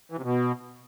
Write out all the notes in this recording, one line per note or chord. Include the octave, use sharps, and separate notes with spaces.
E3
C3
B2